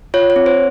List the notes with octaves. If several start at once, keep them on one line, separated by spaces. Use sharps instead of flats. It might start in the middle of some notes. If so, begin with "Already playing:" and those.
F4 C#5
C#5
C4
C5